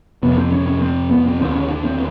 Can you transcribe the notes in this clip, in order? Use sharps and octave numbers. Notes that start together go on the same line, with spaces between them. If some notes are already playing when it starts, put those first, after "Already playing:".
F2 C3 B3
C4
C#4
C#4
C4
B3
C4
D#2 D3 C4
C#4
D4
C4